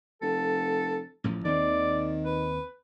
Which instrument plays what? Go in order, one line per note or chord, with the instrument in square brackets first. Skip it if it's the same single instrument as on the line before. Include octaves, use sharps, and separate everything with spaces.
[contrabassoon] F1 [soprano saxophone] A4
[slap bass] A1 A2 F3
[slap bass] D#2 C4 [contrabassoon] D#3 [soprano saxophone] D5
[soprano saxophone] B4